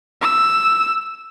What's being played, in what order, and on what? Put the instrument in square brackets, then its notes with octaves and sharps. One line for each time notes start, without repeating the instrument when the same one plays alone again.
[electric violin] E6